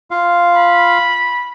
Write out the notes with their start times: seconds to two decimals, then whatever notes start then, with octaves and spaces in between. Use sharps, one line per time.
0.11 F4 F5
0.55 B5